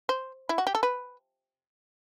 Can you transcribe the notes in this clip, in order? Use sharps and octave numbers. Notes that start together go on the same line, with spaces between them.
C5
E4
F#4
G4
A4
B4